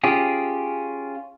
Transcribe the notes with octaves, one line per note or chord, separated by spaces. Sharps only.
C#4 F4 G4 G#4